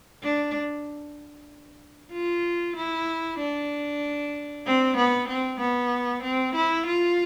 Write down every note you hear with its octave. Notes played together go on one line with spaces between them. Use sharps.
D4
F4
E4
D4
C4
B3
C4
B3
C4
E4
F4